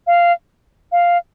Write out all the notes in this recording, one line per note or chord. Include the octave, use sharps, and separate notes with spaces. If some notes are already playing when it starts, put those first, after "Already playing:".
F5
F5